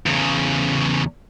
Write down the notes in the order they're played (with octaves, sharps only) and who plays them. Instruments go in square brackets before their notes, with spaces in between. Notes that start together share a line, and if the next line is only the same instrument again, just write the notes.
[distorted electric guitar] E2 C#3